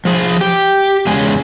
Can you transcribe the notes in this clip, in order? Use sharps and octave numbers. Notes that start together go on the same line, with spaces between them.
F3 G#4
G4
E2 C#3 G#3 G#4